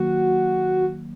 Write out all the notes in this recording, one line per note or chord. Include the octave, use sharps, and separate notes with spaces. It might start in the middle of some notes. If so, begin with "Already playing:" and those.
Already playing: D#3 F#3 A#3 F#4